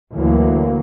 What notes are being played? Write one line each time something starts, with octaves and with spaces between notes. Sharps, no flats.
D2 E3 F#3 A#3